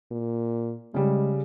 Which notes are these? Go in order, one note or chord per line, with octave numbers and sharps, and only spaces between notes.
A#2
C#3 G3 G#3